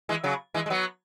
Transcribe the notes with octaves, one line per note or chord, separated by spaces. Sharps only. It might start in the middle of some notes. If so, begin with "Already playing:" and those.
E3 G#3
C#3 F#3
E3 G#3
G#3
F#3 B3